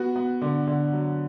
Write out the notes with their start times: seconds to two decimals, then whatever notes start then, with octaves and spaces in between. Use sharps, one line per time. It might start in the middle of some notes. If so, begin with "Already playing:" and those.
Already playing: B3 F#4
0.16 B3
0.42 D3
0.67 D3
0.93 F#3